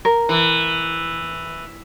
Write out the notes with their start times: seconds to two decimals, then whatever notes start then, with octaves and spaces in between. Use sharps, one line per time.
0.05 A#4
0.29 E3